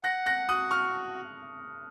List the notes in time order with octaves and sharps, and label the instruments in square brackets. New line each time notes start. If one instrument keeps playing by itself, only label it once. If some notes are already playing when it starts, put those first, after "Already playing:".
[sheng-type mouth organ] F#5 [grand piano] F#6 A#6
[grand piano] F#6 A#6
[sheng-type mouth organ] F#4 [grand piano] D#6 F#6
[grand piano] C#6 F6